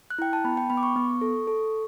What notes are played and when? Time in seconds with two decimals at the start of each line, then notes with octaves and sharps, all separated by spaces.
0.10 F#6
0.18 E4 G5
0.33 A5
0.44 B3 B5
0.57 G5
0.70 B3 B5
0.77 D6
0.83 C#6
0.96 B3
1.21 A4
1.47 A4